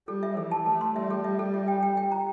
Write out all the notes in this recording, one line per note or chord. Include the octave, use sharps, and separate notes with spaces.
G3 A4
E5
E3 A4
A5
A3 A5
C6
G3 E5
A4
E5
A4
E5
G5
G5
G5
A#5